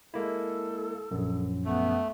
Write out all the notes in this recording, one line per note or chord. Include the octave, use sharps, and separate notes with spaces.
G#3 A#3 E4 A4
A#1 F#2
A3 B3